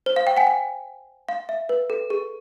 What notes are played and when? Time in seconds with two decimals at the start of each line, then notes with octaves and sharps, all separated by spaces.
0.06 C5
0.16 F5
0.27 F5 G5
0.37 F#5 G#5
0.47 F#5
1.29 F5
1.49 E5
1.69 B4
1.90 A4
2.10 G#4